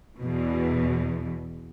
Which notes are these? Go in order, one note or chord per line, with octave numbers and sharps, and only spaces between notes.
E2 B2